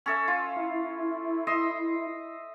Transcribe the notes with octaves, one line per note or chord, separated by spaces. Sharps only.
C#4 A4 E5
F4
E4
D#5 E5 C6